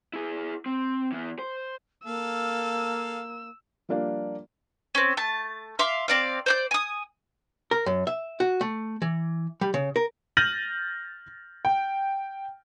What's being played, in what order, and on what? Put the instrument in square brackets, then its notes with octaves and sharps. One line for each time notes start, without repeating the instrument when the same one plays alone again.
[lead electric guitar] E4 G#4
C4
E3 B3
C5
[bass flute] A#3 [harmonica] A4 F5 [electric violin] E6
[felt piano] F3 G3 A#3 D4 D5 F5
[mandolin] C4 C#4
A3 A5
E5 F5 C6 D6
C4 D5 F5
C5 D5 G6
G#5 D#6
[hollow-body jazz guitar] A#4
F#2
E5
F#4
A3
E3
G3
C#3
A#4
[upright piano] F6 G6 A6 A#6 D#7 F#7
G5